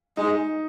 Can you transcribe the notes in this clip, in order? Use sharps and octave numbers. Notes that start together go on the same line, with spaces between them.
G#3 D#4